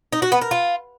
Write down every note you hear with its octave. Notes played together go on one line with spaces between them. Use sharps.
D#4
F#4
B3
A#4
F4